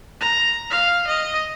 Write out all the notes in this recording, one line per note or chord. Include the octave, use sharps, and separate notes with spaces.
A#5
F5
D#5